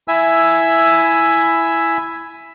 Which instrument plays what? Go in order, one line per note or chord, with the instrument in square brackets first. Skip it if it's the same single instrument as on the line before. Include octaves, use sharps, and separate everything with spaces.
[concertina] E4 E5 G#5 E6